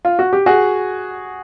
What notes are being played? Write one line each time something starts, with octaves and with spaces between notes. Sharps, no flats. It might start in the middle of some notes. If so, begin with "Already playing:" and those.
F4
F#4
G4
F#4 G#4